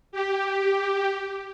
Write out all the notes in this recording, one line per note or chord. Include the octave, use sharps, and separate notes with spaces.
G4